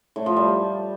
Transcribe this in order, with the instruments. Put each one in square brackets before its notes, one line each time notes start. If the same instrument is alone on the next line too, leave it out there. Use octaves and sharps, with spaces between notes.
[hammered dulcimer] A2
F3
G3